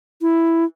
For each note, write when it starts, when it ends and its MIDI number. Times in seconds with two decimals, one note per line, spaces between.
0.22 0.65 64